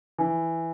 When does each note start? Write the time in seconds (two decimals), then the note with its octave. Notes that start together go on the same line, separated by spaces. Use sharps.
0.18 E3